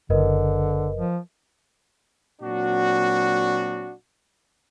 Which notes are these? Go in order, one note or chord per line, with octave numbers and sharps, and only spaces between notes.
F#1 D3 A#4 B4 D#5
F3
A#2 F#3 C4 D4 F#4